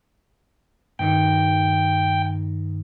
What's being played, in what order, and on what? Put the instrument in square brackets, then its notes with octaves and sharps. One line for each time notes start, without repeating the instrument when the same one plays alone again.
[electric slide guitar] G2 D#3 D#4 [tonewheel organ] G5